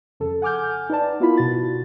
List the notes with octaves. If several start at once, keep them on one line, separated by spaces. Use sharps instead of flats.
F2 C#3 A4
F#5 G#5 D6 F6 G6
D#4 B4 D5 A5
B3 E4 F4 A#4 B5
B2 F4 F#4 A6